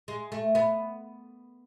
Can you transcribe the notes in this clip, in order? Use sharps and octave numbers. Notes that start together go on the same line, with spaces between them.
G#3
A3
B3